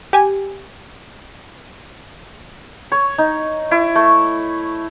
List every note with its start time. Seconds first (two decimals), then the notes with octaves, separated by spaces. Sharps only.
0.13 G4 G#5
2.92 C#5
3.18 D#4
3.71 E4
3.96 A3